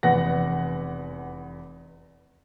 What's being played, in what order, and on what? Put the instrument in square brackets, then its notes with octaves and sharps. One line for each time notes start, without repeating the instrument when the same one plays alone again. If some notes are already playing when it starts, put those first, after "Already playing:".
[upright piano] F1 E2 B3 F#5 A#6